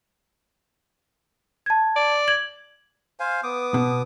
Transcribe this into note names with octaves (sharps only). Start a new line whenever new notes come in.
A5 G#6
D5
G#6 F#7
C5 F5 G#5
B3 D6 D#6
B2